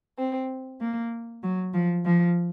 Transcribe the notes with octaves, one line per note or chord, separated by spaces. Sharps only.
C4
A#3
F#3
F3
F3